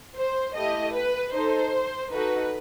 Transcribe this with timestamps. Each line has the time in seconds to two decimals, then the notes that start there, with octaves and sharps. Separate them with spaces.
0.16 C5
0.55 A3 E4 G4 D#5
0.94 B4
1.33 D#4 A4 C5
2.11 D#4 F#4 A4 B4